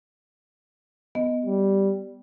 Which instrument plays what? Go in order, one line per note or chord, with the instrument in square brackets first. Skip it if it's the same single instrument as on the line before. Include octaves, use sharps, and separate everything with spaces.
[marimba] B3 D#5
[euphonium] G3